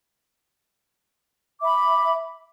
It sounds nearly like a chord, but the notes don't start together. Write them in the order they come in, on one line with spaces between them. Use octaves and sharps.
D6 E5 B5